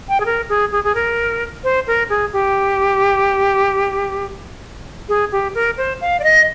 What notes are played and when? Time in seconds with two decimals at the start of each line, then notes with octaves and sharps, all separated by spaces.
0.09 G5
0.20 G#4
0.26 A#4
0.49 G#4
0.72 G#4
0.84 G#4
0.95 A#4
1.64 C5
1.87 A#4
2.10 G#4
2.33 G4
5.09 G#4
5.32 G4
5.55 A#4
5.77 C5
6.01 F5
6.20 D5
6.24 D#5